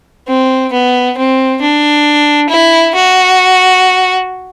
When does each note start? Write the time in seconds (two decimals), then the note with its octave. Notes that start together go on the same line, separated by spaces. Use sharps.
0.28 C4
0.72 B3
1.17 C4
1.61 D4
2.49 E4
2.94 F#4